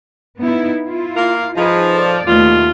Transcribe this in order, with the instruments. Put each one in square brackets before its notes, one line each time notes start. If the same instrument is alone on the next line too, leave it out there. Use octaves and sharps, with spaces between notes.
[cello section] B3 D#4 E4
E4 F4
[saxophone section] A#3 A#4 F5
[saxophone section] F3 [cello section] D#4 G#4 B4
[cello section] A4 D5
[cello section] D#2 A3 [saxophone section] B2 F4